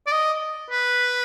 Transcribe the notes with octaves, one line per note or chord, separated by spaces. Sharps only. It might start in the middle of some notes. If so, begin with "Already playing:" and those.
D5
D#5
B4